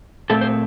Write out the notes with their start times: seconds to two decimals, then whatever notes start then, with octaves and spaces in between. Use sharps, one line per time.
0.30 A#2 A3 C4 A4
0.41 C5